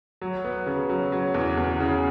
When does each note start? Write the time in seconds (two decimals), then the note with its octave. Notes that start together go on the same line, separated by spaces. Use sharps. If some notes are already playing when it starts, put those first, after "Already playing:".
0.22 F#3
0.44 B3
0.66 C#3
0.90 F#3
1.12 F#3
1.34 E2
1.57 E2
1.80 C#3